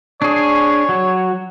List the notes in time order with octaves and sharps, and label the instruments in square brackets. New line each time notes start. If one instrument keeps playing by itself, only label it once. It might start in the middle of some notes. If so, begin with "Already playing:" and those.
[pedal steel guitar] D4 G#4 [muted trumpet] C#5
[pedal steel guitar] F#3